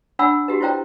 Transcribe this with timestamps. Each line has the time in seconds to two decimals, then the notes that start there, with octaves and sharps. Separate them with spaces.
0.19 D4 C#5 F#5 G#5 B5 E6
0.48 F#4 G4 B4
0.60 E4 F4 C5 C#5 G5 A#5